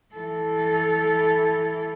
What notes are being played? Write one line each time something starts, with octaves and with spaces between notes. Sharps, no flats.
E3 A4